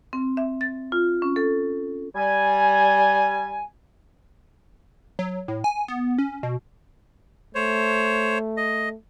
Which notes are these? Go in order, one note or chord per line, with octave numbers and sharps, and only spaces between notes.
C4
E5
A6
F4
C#4
A4
G3 G#5
F#3
A2
G#5
B3
C#4
B2
A3 C5 C#5
D#5